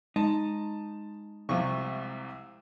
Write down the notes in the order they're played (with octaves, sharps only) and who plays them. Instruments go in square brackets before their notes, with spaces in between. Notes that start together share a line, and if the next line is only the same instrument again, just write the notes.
[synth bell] G#3 [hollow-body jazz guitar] D#4 [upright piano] A5
[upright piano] C2 C3 [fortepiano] F3 C#6